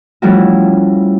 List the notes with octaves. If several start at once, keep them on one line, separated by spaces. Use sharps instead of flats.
F3 G3 A3 C#4 E4 F#4